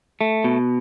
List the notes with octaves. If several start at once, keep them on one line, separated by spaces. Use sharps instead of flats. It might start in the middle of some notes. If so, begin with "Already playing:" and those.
A3
B2